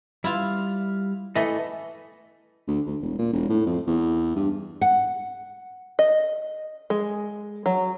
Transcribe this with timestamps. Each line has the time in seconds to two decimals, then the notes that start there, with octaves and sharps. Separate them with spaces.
0.24 G3 E4 F4 F5
1.35 E3 A3 B3 A4 D#5
2.68 D2
2.86 D2
3.01 E1
3.19 A#2
3.33 E1
3.50 A2
3.66 F2
3.87 E2
4.36 G2
4.81 F#5
5.99 D#5
6.90 G#3
7.66 F#3